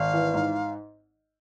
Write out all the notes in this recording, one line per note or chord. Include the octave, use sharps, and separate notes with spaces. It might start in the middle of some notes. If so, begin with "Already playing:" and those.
Already playing: G#1 F5
E3
G#2